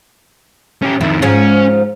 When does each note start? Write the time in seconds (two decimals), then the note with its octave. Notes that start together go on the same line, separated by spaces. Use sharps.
0.82 C#4 G4
1.01 F2 D#3 E4
1.22 G#2 F3 G#3 C#4